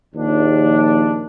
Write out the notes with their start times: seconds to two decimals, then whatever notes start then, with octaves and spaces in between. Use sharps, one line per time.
0.15 A#1 D#2 D4